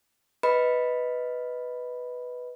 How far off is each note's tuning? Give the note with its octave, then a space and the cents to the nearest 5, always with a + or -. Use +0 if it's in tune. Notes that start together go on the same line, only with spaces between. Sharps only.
B4 +0 D#5 +15 B5 +0